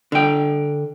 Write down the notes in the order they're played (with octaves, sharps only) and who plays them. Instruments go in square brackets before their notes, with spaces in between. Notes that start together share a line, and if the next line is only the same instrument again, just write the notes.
[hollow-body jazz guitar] D3 G5